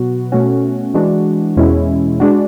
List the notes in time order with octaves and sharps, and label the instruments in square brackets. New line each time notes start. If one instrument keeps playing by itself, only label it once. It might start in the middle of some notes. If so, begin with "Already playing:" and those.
Already playing: [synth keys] B2 F#3 B3 F#4
B2 A3 C#4 F#4
E3 G#3 D4 F#4
E2 B2 G#3 C#4 E4
G#3 D4 F#4